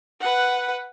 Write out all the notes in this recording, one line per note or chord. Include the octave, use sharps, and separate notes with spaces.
B4 F#5